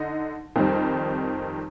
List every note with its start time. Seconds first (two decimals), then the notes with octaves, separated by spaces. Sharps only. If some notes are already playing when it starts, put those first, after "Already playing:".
Already playing: D3 D#4
0.56 F2 D#3 G3 C4 D#4